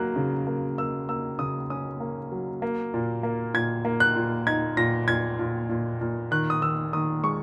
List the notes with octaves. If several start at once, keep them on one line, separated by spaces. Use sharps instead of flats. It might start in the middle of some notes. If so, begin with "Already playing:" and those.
Already playing: F#3 A#3 F#6
C#3
A#3
A#3 E6
A#3 E6
C#3 D#6
C#4 D#6
A#3
F#3
A#3
A#2
A#3
A#2 G#6
A#3
F#6
A#2
D#4 G#6
A#2 A#6
A#2 G#6
A#2
A#2
A#2
D#3 F#6
D#6
D#3 E6
D#3 D#6
G#3 C#6